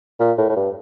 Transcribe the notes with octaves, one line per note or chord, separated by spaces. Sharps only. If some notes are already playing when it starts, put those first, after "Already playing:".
A#2
A2
A2
G2